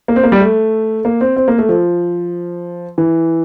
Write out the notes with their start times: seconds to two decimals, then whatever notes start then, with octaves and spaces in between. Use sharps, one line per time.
0.08 A#3
0.16 C4
0.23 A#3
0.32 G3
0.40 A3
1.05 A#3
1.21 C4
1.36 C4
1.48 A#3
1.58 A3
1.69 F3
2.98 E3